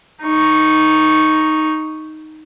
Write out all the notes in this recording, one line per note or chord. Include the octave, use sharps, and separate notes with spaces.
D#4 C#6